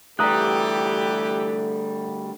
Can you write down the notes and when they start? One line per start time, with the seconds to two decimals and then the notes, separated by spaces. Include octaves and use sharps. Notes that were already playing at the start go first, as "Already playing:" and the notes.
0.19 D2 E3 G3 G4 A4 A#5 D#6 F#6